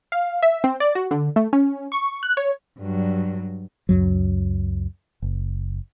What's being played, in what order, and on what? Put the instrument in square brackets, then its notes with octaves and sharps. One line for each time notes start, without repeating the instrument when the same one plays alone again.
[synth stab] F5
E5
C4
D5
F#4
D3
A3
C#4
C#6
F#6
C#5
[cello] G2 F#3
[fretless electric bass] C#2 F#2 F#3
F#1